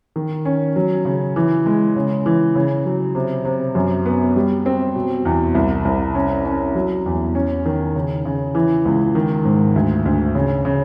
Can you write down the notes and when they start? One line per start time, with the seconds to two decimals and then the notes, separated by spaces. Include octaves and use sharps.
0.16 D#3
0.45 C#4
0.76 F#3
1.05 C#3
1.36 E3
1.66 G#3
1.96 C#3
2.26 E3
2.55 C#3
2.86 F#3
3.15 C3
3.45 C3
3.75 F#2
4.06 B3
4.36 G3
4.66 C4
4.96 B2
5.25 E2
5.55 C2
5.85 C2
6.15 C#4
6.46 C#4
6.75 F#3
7.06 E2
7.35 C#4
7.66 D#3
7.95 C#3
8.25 C#3
8.55 E3
8.85 C#2
9.15 D#3
9.45 G#2
9.76 D2
10.05 D2
10.35 C#3
10.65 C#3